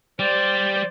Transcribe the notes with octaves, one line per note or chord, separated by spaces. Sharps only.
G3 C5 D5